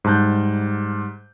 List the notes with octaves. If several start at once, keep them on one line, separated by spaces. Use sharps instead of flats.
G#2 G3 A5 F#6 G6